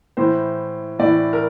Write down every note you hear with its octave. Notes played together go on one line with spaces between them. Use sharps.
A2 E3 C5
A2 D5
E3
A#4